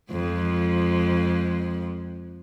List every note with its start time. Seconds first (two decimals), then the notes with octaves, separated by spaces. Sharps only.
0.12 F2 F3 G#3